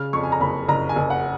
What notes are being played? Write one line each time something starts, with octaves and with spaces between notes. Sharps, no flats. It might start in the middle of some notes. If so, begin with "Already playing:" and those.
Already playing: C#3 F6
F2 C#6
G#5
A#5
F#1 B5
F#1 A#5
G#5
F#1
F#5